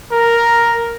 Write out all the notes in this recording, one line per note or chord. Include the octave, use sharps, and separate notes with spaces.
A#4